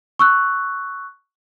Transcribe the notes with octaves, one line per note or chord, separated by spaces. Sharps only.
C#6 E6 F#6